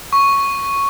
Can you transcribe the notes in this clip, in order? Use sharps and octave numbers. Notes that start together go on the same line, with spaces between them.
C#6